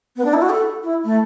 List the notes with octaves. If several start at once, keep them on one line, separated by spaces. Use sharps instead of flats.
B3
D4
E4
F#4
A4
E4
A3